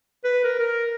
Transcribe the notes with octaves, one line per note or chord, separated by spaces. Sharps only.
B4
A#4
A#4